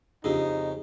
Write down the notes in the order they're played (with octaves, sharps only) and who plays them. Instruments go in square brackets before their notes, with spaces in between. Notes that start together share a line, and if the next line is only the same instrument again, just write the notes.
[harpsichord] F2 C#3 [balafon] D4 F4 G4 [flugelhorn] D#4